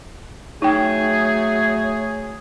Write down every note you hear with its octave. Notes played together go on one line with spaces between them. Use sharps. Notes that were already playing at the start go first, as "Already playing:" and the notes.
F#3 A3 D#4 G#4 G5